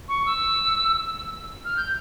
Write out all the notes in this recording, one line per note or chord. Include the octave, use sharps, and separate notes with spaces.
C#6
E6
F6
G6